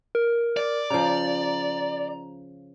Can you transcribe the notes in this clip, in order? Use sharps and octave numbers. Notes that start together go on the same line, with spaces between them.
A#4
D5
C#3 F3 A#5